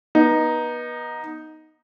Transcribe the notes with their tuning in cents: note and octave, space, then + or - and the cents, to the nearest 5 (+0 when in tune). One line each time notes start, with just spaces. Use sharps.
B3 -25 D#4 +0